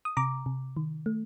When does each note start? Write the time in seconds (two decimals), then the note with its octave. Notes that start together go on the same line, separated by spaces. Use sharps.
0.05 D#6
0.17 C3 A#5 D6
0.46 C3
0.77 D#3
1.06 A3